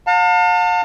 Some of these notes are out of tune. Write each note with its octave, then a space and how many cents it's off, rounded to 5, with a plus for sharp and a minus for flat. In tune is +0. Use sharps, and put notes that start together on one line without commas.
F5 +45 A5 +40